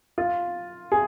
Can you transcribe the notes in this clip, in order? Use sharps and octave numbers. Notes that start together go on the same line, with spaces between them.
F4
G#4